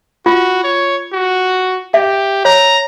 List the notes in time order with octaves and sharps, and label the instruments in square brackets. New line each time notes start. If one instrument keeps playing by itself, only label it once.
[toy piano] F4 [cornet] F#4
[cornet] C#5
F#4
[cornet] G4 [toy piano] E5
[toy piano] C#5 [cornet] A#5